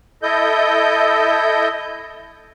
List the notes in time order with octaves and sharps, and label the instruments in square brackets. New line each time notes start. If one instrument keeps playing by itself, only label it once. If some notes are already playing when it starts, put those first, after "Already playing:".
[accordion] E4 A4 D#5 G6